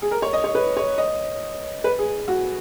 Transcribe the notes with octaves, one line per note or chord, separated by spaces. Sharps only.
G#4
A#4
C#5
D#5
C#5
B4
C#5
D#5
B4
G#4
F#4